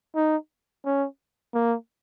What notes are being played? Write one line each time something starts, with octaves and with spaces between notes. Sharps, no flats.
D#4
C#4
A#3